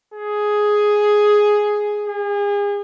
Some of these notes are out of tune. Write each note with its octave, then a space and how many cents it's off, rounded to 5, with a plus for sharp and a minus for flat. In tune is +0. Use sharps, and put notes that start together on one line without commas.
G#4 +5
G#4 -35